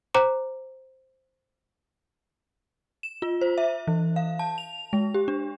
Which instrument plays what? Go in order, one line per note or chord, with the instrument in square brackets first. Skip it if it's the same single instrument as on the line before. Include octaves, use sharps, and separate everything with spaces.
[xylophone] C5 A#5 D6
[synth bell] E7
F4
C5
E5
E3
F5
A5
F7
G#3
G4
D4